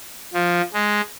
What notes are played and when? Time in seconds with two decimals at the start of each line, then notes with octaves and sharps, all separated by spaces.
0.34 F3
0.73 G#3